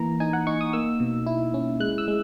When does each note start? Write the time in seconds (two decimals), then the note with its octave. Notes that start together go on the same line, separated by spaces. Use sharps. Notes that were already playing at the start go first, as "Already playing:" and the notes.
Already playing: E3 A#3 A#5
0.20 D#4 G#5
0.33 F#5
0.47 D#4 C#6
0.61 D#6
0.73 A#3 E6
1.00 B2
1.27 E4
1.54 C#4
1.80 G#3 F#6
1.98 E6
2.08 G#3